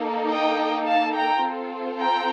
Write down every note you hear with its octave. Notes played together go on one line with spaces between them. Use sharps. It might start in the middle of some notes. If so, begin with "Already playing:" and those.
Already playing: A#3 D#4 A4
D#5 G5
F5 A5
G5 A#5
C4 F4 A4
G5 A#5